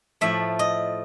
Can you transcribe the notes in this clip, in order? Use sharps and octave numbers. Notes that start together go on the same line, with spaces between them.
A2 F3 A3 E5
D#5